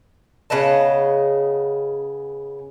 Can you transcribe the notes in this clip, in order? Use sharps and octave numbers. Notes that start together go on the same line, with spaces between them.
C#3 B3 D#5 A5